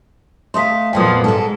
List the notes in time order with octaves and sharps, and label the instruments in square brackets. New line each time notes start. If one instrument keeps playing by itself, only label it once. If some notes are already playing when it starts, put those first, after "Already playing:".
[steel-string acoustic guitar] A3 D#5 F5 [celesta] C6 D#6 B6
[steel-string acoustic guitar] F2 A#2 B3 [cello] F3 A#3 [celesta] G5 C6 D#6
[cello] G#2 [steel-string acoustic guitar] G#3 A4